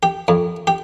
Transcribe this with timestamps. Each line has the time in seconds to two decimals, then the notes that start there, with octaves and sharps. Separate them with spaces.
0.03 G4
0.28 F2
0.67 G4